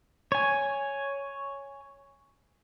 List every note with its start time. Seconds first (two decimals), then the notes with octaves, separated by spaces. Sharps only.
0.32 C#5 G#5